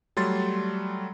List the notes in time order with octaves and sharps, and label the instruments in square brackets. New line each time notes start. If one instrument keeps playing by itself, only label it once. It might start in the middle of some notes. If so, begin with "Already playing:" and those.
[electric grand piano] F#3 G3 A3 C6 A6